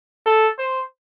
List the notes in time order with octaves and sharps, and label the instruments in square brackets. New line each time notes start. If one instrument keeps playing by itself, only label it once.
[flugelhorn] A4
C5